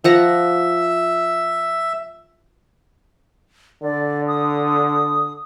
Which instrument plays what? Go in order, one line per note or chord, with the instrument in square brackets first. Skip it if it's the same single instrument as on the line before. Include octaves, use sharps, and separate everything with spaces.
[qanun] F3 F#5 A#5 [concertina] E5
[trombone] D3 [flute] D5
[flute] D#6